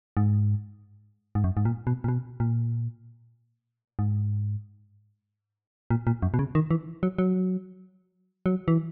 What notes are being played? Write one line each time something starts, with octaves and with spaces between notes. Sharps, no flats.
G#2
G#2
F#2
G#2
A#2
B2
A#2
B2
A#2
G#2
A#2
A#2
F#2
B2
C#3
D#3
E3
F#3
F#3
F#3
E3